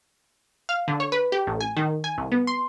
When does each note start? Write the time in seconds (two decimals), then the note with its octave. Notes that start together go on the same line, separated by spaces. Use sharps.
0.69 F5
0.88 D3
1.00 C#5
1.12 B4
1.32 G4
1.47 A1
1.61 G#5
1.77 D#3
2.04 G#5
2.18 C2
2.32 B3
2.47 C6